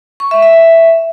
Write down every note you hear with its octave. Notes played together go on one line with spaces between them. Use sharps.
C#6
E5
E5